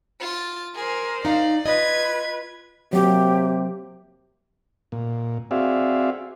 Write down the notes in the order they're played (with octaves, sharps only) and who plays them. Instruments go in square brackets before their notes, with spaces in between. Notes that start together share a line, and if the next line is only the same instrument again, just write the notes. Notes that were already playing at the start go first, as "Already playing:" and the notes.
[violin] F4 A6
[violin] G#4 [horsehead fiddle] A#4 C5
[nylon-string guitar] D#4 F5 [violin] D5
[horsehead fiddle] F4 B4 [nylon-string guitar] D#5 [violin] G#6
[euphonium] C3 [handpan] F#3 A#3 [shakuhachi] G4
[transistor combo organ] A#2
C4 F#4 G#4 D5 E5 F5